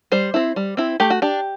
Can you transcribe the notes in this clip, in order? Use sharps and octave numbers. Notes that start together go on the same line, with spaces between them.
G3 C5
C4 E4
G3
C4 E4
A3 G4
F#4
D4 G4